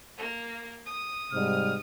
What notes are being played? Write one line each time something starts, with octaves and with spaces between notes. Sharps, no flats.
A#3
D#6
G#2 C3 G3 F6